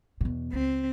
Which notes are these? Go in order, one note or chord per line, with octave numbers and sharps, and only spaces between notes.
E2 B2
C#2 C4